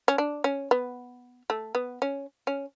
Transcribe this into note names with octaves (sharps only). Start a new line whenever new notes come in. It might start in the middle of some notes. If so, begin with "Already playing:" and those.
C#4
D4
C#4
B3
A3
B3
C#4
C#4